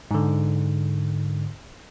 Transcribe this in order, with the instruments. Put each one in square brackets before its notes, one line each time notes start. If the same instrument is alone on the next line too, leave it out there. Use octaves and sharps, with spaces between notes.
[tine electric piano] G#2 D3